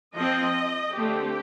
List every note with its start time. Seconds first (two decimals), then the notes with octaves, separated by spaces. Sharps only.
0.15 F3 C4 D#5
0.94 D3 A3 C4 G4